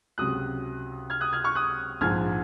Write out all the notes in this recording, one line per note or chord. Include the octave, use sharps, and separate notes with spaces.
C#2 C3 F#3 D#6 F#6
F6 G#6
D#6 F#6
F6 G#6
C#6 F6
D#6 F#6
A#1 G#2 F3 F6 G#6